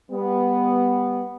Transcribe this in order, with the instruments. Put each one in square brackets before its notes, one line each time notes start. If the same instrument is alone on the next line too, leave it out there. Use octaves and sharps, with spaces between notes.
[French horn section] G3 B3